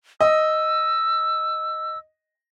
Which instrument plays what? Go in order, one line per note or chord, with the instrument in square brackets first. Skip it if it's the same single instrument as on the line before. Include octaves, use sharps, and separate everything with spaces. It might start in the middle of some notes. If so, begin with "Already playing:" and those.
[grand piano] D#5 [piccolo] E6